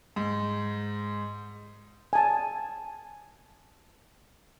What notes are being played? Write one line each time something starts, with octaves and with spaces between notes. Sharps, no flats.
G#2
G#5 A5